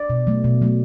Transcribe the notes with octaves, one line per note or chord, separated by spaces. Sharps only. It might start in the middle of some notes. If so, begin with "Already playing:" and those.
Already playing: D5
B2
F#3 A3
B2
F#3 A3